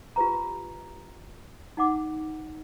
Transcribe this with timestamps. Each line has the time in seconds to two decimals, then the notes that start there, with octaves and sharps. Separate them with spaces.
0.16 F4 G4 B4 A#5
1.77 D#4 F#5 D6